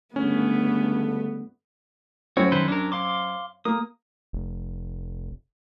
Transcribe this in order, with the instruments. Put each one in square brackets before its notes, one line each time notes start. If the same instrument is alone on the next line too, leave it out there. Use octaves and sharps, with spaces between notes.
[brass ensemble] C#2 G2 D3 [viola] A3 B3 [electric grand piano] C#4
[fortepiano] F#2 C4 C#5 [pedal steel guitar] F#4
[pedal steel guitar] D#3 B4 C5
D4 A#4
F5 C6 D6
[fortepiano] A#3 [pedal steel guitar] D#6
[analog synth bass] F1